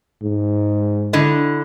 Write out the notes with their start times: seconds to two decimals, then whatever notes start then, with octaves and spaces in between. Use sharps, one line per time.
0.23 G#2
1.13 D3 E4 D#5